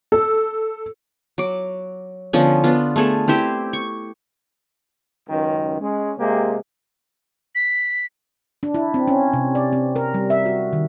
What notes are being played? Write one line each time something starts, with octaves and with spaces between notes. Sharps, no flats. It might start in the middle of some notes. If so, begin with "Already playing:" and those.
A4
F#3 D6
D3 F3 B3 C#4
B3 D4 F4
A3 B3 G#4 A4
C4 E4 G4 C5
C#6
C#2 F#2 D#3
G#3 C#4
C3 G#3 A#3 G4
B6
D4
E4
C4
C#4
C3
D5
C4
A#4
G3
E5
F#4
D#3